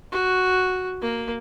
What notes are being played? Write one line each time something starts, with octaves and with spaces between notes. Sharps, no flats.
F#4
A#3